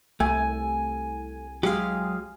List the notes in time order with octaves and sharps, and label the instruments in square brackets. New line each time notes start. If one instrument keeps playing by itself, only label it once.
[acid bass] C2 [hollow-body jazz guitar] A3 [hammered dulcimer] G#5
[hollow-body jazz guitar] F#3 G4 [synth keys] G#3 G#4 F5